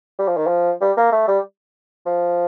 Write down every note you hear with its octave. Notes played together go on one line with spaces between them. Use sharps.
G3
F3
D#3
F3
G3
A#3
A3
G3
F3